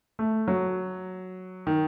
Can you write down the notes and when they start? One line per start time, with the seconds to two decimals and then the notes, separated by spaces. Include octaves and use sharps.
0.19 A3
0.48 F#3
1.67 D#3